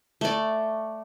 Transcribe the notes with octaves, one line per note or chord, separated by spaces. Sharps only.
A3 D5